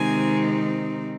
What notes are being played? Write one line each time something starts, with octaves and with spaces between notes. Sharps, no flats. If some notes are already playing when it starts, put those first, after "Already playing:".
Already playing: C3 D#3 G#3 C4 D#4 G#5